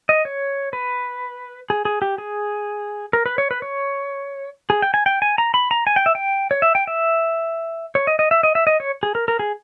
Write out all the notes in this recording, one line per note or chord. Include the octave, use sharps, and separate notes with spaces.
D#5
C#5
B4
G#4
G#4
G4
G#4
A#4
B4
C#5
B4
C#5
G#4
G5
G#5
G5
G#5
A#5
B5
A#5
G#5
G5
E5
G5
C#5
E5
G5
E5
C#5
D#5
D#5
E5
D#5
E5
D#5
C#5
G#4
A#4
A#4
G#4